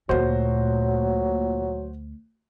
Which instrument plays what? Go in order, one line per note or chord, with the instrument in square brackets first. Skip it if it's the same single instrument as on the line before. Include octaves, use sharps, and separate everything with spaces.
[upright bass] D2 A3 [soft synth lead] A#2 [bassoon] F#3 [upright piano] F#4 C5